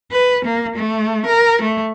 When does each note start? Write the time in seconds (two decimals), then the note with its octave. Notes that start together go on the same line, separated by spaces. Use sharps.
0.12 B4
0.45 A#3
0.76 A3
1.26 A#4
1.62 A3